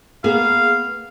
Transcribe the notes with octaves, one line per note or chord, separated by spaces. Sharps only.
A#3 B3 G#4 F5